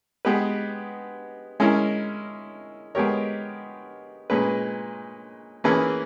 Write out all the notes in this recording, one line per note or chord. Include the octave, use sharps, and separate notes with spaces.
G#3 B3 G4 B4
G#3 C#4 E4 A#4
G#3 B3 G4 A#4 C#5
A#2 G#3 C#4 G#4 B4
E3 A#3 C#4 G#4 B4